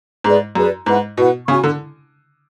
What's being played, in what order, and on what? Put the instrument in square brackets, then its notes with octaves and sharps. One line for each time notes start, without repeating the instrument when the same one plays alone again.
[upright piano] G#2 [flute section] G#4 B4 D5
[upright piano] F#2 [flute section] G#4 B4 D5
[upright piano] G#2 [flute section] E4 B4 F#5
[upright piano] B2 [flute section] E4 B4 F#5
[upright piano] C#3 [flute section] F#4 C#5 G#5 C#6
[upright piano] D3